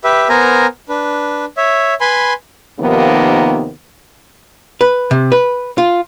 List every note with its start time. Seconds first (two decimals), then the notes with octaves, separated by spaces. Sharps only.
0.04 G4 B4 E5
0.29 B3 A#4 C5 G#5 A#5
0.89 D4 B4
1.57 C#5 E5
2.01 B4 G#5 B5 C6
2.80 D#2 C3 D#3 F3 A#3 B3
4.81 B4
5.11 C3
5.32 B4
5.78 F4